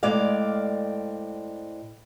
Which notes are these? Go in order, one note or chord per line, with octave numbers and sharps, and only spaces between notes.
A2 G#3 C4 D5 F5